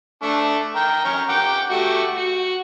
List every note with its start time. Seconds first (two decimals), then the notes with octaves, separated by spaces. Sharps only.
0.23 A3 D4
0.76 A#4 G5
1.05 C#4 A#4
1.29 F#5 G5 D6
1.71 A3 F#4 G4
2.17 F#4